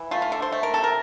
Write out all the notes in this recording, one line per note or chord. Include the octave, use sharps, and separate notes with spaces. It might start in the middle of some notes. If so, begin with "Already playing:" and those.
Already playing: E3
A3 F4
F4
D3 A4
C5
A3
A#4
C3 A4
A#4